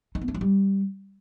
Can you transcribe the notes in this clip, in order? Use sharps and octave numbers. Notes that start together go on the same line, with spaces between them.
D#4
B3
D4
F#3
G3